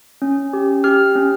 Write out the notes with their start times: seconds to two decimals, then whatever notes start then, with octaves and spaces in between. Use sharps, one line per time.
0.22 C#4
0.53 G4
0.84 G4 F6
1.15 C#4